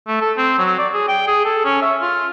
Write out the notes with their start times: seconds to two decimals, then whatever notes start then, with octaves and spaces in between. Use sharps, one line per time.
0.07 A3
0.21 A4
0.38 C4
0.58 F#3
0.79 D5
0.94 G#4
1.08 G5
1.27 G#4
1.45 A4
1.65 C#4
1.82 E5
2.01 F4